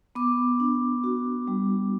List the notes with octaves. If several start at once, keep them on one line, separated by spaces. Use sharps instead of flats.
B3 D6
D4
F#4
G3